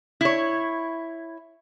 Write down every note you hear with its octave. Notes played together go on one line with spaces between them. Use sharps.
E4 C#5